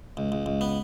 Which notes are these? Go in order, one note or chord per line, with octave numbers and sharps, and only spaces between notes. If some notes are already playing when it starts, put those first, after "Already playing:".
C#2
C#2
C#2
B3